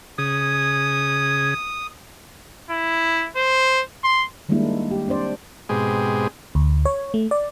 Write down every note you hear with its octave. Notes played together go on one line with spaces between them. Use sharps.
C#3 G#4 D#6
E4
C5
C6
D#3 G3 G#3 A#3 D4 E4
G4
C4 D4 C5 D5
G#2 B2 G#3 C4 G4 G#4
D2
C#5
A3
D5